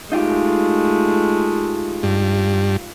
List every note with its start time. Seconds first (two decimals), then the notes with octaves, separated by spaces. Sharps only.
0.12 G#3 A3 D#4 F4 G4
2.03 G2